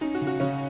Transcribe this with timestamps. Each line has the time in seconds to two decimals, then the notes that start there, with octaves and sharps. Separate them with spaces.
0.01 C#4 D#4
0.14 F#4
0.21 C#3
0.27 F#4
0.40 C#3 C#4